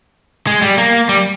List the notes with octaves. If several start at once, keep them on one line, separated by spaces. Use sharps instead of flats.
G#3
G3
A#3
G3